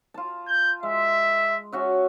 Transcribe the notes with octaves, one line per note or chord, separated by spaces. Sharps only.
F4 A5
G6
G#3 E5
C#4 F#4 E5